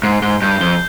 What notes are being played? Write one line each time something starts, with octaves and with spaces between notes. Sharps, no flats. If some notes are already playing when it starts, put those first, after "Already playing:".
G#2 C7
G#2 G7
G2 G6
F2 G7